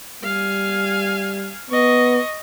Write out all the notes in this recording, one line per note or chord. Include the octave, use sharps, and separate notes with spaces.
G3 F5 G#5
B3 D#5 C#6